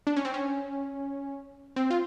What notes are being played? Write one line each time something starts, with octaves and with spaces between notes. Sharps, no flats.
D4
C#4
C4
C#4
C4
F4